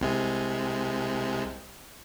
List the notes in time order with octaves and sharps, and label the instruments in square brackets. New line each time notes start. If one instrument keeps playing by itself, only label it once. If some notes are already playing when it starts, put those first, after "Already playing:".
[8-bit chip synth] C2 C3 G#3